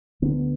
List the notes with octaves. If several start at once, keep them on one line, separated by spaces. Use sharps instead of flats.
D2 D3 B3